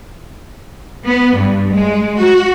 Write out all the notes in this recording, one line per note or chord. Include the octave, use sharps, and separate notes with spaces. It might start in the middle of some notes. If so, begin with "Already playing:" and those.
B3
G2
G#3
F#4